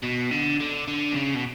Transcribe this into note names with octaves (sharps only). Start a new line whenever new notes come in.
B2
D3
D3
D3
B2
C#3
B2